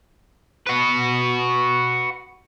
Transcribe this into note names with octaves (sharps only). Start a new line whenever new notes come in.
F#4 B4